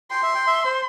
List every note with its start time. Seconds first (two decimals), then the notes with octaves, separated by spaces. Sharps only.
0.11 G5 C6
0.23 E5
0.35 G5
0.47 E5
0.65 C5